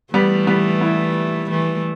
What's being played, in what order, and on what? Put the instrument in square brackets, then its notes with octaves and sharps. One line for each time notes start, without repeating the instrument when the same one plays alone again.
[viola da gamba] E3 A3 [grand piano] G3 B3
[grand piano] G3 B3
B3 E4
[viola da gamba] E3 A3